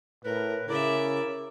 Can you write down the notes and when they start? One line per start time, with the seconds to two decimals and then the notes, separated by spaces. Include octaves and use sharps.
0.25 A2 A#4 B4
0.68 C#3 E4 A#4 D5 E5